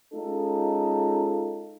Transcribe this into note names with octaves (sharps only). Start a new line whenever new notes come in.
G#3 C#4 D#4 F4 A4